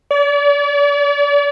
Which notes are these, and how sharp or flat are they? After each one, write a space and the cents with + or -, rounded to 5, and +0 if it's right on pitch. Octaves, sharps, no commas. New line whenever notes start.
D5 -40